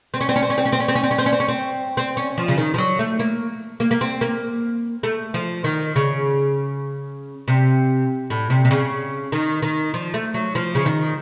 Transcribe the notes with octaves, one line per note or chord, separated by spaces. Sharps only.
C4
C#4
C4
C#4
C4
C#4
C4
C#4
C4
C#4
C4
C#4
C4
C#4
C4
C#4
C4
C#4
C4
C4
C#4
F3
C#3
D#3
F3
F#3
A3
A#3
A#3
A#3
C4
A#3
A3
F3
D#3
C#3
C3
A2
C3
C3
C#3
D#3
D#3
F3
A3
F#3
F3
C#3
D#3